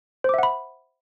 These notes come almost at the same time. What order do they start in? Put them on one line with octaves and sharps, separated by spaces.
C5 D6 E5 F#5 B5